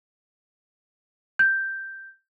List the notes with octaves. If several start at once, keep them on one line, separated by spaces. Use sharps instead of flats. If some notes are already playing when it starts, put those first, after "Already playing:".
G6